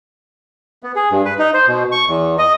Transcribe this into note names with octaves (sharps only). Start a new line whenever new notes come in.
B3
G#4
G2
B4
D#4
C5
B2
C#6
E2
D#5